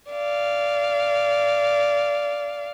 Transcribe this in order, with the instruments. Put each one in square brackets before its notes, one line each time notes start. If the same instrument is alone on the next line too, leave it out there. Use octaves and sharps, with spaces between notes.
[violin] D5 F5